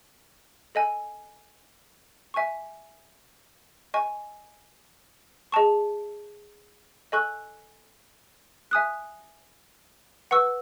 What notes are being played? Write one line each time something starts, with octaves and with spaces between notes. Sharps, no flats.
A4 D#5 G#5
E5 G#5 C#6
D#5 G#5 C#6
G#4 D#5 A5 C#6
A4 D#5 G#5 C#6 F#6
E5 G#5 D#6 F#6
B4 F#5 C#6 E6